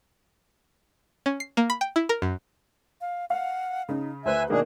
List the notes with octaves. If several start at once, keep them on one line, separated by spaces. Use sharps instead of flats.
C#4
C7
A#3
B5
G5
E4
A#4
F#2
F5
F5 F#5
C#3 D#4
D2 B4 C5 E5 G#5 F#6
B2 D#3 A#3 D4 G#4